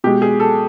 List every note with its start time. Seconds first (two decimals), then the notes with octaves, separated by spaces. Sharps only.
0.04 B2 G#3 G4
0.22 G#4
0.40 A4